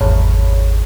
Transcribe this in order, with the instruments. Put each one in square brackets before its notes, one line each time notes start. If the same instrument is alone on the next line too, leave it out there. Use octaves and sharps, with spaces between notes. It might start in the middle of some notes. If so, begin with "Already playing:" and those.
[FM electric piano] G#1 E2 C#5